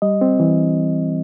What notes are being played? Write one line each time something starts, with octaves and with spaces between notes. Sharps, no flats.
G3 D#5
C4
E3